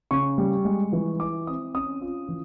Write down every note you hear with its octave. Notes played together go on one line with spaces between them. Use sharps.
C#3 C#6
G3
G#3
E3
E4 D6
C4 D#6
C#4 D#6
F4
E3